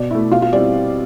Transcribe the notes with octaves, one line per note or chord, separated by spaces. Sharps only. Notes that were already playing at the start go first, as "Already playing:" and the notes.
Already playing: B2 D5
A3 E4
B2 F4 F5
F4 F5
G3 C4 E4 D5